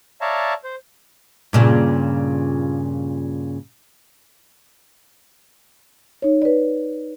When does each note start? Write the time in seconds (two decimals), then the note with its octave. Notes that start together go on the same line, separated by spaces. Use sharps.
0.21 C#5 D5 E5 F5 A5 A#5
0.64 C5
1.53 G2 A#2 C#3
6.22 D#4 C#5
6.42 B4 D5